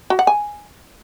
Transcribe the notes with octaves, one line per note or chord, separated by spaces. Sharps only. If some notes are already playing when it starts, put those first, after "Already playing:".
F#4
F#5
G#5